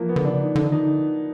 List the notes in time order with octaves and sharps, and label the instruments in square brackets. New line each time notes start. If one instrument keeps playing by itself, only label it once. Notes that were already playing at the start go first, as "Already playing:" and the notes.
Already playing: [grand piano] E3 F3 A#3
B3
[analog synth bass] D3
[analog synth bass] C#3 [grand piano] D4
[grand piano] D#4
[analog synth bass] D3 [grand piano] D4
[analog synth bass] D#3
[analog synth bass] D3 [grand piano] D#4